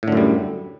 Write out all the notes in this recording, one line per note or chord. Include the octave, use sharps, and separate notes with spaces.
F#2 A2 D3 G3